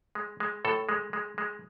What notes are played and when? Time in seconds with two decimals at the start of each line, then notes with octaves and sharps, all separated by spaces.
0.15 G#3
0.40 G#3
0.65 A2 A4
0.89 G#3
1.13 G#3
1.38 G#3